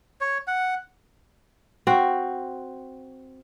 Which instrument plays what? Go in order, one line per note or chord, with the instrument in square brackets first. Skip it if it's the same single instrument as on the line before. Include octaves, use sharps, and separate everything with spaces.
[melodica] C#5
F#5
[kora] C4 F#4